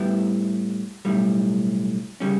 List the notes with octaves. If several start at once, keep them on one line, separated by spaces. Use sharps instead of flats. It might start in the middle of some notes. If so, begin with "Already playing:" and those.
Already playing: A2 G3 B3 E4
B1 A2 G3
C#3 G3 C#4